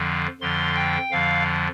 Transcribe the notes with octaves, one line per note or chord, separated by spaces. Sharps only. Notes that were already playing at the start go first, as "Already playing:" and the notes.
Already playing: F2 D3 F3
F2 D3 F3 C6
G5
F2 D3 F3 F5